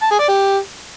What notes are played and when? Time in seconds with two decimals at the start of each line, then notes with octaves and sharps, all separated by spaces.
0.02 A5
0.11 G#4
0.20 D5
0.28 G4